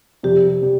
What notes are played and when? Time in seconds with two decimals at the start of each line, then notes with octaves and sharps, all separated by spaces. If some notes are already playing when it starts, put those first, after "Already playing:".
0.23 F2 C3 G3 G4
0.62 C3 G3